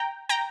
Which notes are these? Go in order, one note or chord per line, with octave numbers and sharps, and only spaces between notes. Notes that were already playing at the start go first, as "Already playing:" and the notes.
Already playing: G5 A#5
G5 A#5